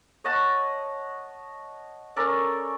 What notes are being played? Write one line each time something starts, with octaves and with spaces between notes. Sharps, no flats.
C#5 D#5 F#5 A5
C#4 A4 A#4 D5